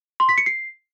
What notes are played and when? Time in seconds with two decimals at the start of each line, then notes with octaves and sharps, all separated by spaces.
0.20 C6
0.29 B6
0.38 C#7
0.46 C7